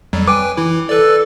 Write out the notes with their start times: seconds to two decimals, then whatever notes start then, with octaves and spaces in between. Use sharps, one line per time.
0.13 F2 F#3 G3
0.28 B4 G5 G#5 D6
0.57 E3 E4
0.89 A4 B4 D5